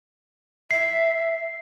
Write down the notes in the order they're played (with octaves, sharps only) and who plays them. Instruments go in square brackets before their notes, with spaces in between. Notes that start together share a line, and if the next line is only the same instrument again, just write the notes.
[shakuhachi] E5 [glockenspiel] C7